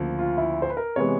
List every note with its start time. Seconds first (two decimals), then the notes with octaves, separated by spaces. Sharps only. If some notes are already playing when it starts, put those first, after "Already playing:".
Already playing: D2 C#3 F3 A#3
0.19 F4
0.38 E4
0.62 C5
0.70 B4
0.77 A#4
0.96 C3 E3 G#3 B3 C#5